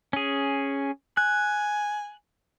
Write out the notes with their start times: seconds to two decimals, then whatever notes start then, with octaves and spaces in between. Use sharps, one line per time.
0.13 C#4 G#4
1.17 G#5 F#6